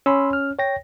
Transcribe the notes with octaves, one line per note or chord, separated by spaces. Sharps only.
C#4 B5 C6 E6
F6
C#5 G5 A#6